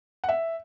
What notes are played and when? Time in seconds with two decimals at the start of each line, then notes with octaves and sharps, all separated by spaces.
0.24 F#5
0.29 E5